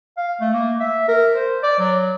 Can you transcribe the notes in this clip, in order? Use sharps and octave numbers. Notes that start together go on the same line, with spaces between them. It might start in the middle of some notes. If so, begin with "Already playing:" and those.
F5
A3
A#3
E5
A#4
C5
D5
F#3